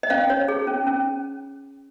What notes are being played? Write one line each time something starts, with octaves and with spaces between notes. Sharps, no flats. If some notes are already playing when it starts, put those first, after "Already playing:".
D#5
C#4 F5
C#5
G#4
C#4
C#4